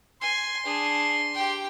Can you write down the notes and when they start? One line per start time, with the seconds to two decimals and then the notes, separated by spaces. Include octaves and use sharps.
0.21 G#5 C6
0.65 D4 G#4
1.34 G4 G5